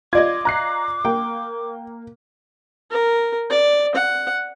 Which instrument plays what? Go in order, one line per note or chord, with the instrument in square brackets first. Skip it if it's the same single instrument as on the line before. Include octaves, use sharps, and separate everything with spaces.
[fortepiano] F4 D5 D#5 [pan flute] D6 [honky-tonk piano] G#6
[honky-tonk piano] A#5 F#6 C7
[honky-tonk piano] A#3 [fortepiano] G5
[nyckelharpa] A#4
D5
F#5